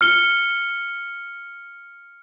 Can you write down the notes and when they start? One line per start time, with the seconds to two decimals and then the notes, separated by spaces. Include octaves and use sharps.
0.01 F6 C#7 G7